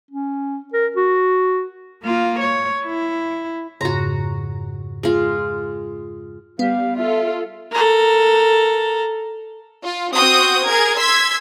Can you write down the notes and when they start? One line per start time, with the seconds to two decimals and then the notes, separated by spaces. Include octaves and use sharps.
0.11 C#4
0.73 A#4
0.96 F#4
2.03 A#3 F4
2.39 C#5
2.86 E4
3.81 F2 G#2 C#3 F#4 A#5
5.03 G#3 F4
6.59 G3 B3 F5
6.97 F4 A4 E5
7.72 A4 A#4
9.83 F4
10.15 C4 F#4 D#6 G6
10.64 G#4 A#4 G#6
10.98 C6 E6 G#6 B6